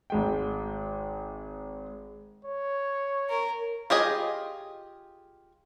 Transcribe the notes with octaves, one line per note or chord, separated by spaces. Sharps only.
G#1 G#3 G5
C#5
A#4
F4 G4 G#4 D#5